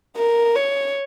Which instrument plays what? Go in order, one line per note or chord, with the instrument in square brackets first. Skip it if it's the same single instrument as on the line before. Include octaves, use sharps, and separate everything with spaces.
[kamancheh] A#4
C#5